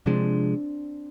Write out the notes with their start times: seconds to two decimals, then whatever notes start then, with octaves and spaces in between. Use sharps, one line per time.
0.06 C3 F3 G#3 C4 D4